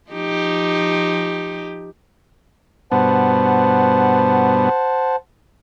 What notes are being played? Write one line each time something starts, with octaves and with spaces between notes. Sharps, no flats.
F3 D#4 G4
G2 B2 B3 C5 F#5 A5